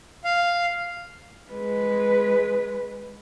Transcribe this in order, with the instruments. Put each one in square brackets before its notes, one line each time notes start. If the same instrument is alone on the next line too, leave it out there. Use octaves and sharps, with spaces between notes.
[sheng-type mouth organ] F5
[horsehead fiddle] G#3 B4